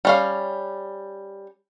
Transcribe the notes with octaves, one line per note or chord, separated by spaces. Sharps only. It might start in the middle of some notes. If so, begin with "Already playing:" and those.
G3 C#4 F5